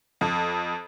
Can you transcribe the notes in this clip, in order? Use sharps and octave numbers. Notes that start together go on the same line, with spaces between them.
F2